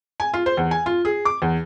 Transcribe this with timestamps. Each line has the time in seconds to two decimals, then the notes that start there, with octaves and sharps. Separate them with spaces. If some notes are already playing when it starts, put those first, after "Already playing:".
0.20 G#5
0.34 F4
0.46 C5
0.57 E2
0.71 G#5
0.86 F4
1.05 G#4
1.25 D6
1.42 E2